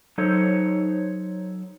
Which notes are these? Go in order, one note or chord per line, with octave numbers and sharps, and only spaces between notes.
F#3 D#4 A4 C5 C#5